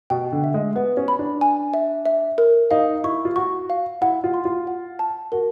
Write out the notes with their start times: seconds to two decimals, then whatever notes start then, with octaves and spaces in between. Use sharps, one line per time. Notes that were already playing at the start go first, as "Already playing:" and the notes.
0.10 B2 G5
0.32 D3
0.44 E5
0.54 G#3
0.75 B3 B4
0.97 C#4
1.08 B5
1.19 D4
1.41 G#5
1.74 E5
2.06 E5
2.38 A#4
2.71 D#4 F5
3.04 E4 C#6
3.25 F4
3.36 F#4 C#6
3.70 F5
4.01 E4 F#5
4.24 F4
4.34 C6
4.45 F4
4.67 F#5
4.99 A5
5.32 F#4 A#4